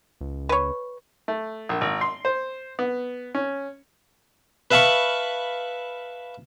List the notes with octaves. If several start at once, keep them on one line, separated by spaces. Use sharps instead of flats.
C#2
B4 C#5
A3
A#1
G#1
C6
C5
B3
C#4
B4 E5 F5 A5 B5 C#6